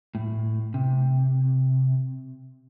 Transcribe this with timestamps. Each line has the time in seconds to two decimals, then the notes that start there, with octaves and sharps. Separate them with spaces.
0.15 A2
0.74 C3